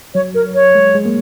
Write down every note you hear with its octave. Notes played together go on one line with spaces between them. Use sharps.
F#3 C#5
A#4
C#5
G#3
G#3
A#3